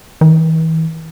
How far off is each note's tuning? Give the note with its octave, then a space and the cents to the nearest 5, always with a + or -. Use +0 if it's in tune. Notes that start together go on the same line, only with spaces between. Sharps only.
E3 -40